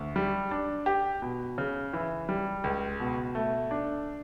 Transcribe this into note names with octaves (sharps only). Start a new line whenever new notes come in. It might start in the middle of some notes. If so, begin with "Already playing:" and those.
Already playing: D2
G3
D4
G4
B2
C#3
E3
G3
C#2
B2
A3
D4